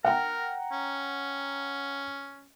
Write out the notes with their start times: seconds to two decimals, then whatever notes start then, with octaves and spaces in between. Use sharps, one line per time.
0.05 A#4 F#5 G5 A#5
0.72 C#4